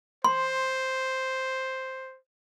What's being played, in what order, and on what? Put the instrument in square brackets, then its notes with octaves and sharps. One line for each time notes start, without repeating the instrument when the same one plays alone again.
[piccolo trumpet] C5 [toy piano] C6